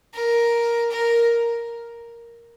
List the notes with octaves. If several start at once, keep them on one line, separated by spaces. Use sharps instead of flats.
A#4
A#4